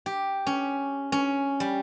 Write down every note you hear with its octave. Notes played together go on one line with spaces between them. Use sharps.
G4
C#4
C#4
G3